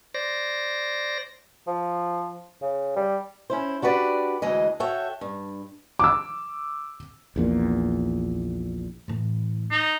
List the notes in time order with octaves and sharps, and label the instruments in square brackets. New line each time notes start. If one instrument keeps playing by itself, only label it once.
[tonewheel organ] C5 D5 A#6
[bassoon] F3
C#3
G3
[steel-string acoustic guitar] C#4 E4 C5
D4 F#4 G4 B4 D5
D2 E3 G#3 D#5
F#4 A4 C#5 E5 G5
G2
[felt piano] D6 E6
[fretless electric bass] A#1 E2 A#2
[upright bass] A2 E3
[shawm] D#4